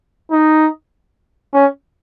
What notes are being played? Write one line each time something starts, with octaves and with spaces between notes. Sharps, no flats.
D#4
C#4